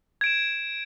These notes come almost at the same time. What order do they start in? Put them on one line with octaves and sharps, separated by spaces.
G#6 D7 E7